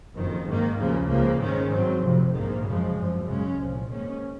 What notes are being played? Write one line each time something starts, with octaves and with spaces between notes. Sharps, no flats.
F#1 F2 D#3
G#2 D#3 A#3
D#2 C#3 F3 A#3
C#2 C#3 F3 A#3
G#2 D#3 G#3 C#4
G#2 F#3 C4
F1 F2 C3 F3
A#1 G#2 D#3 A#3
F#2 C#3 F3 G#3
G#1 F#2 F3
F#2 C#3 G#3 C#4
C2 A#2 F3
G#2 D#3 A#3 C#4